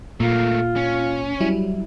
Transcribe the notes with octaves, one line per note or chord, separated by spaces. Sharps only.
A#2 A3 A#3 F4
C#4
F#3 G3 E4